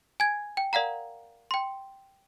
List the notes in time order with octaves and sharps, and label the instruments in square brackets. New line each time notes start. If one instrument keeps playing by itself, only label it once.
[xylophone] G#5 G#6
G5
A#4 D5 F5 F#5 A#5
G5 C6